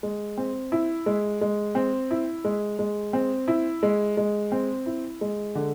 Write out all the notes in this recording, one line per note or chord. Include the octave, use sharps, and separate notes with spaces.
G#3
C4
E4
G#3
G#3
C4
E4
G#3
G#3
C4
E4
G#3
G#3
C4
E4
G#3
D3